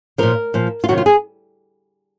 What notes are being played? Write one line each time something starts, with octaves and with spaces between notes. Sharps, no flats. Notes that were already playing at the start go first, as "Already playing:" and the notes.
A#2 F3 A#4
A#2 F3
F4
C3 D#3 F#3 F#4
F4
G#4